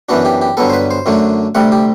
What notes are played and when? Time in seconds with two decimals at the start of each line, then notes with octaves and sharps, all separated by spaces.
0.09 F#2 E3 B3 D4 F#4
0.25 G4
0.41 G4
0.57 G2 D3 F#3 B3 A4
0.70 C5
0.73 B4
0.91 C5
1.06 F#2 D3 F#3 A3 D4
1.55 D2 C3 G3 F#5
1.72 G4